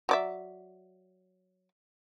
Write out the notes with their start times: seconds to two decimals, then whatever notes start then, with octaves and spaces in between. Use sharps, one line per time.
0.09 F#3 D5 E5